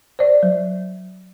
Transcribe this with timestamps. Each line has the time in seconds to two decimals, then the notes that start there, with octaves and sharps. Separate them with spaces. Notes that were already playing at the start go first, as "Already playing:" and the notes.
0.19 C5 D5
0.43 F#3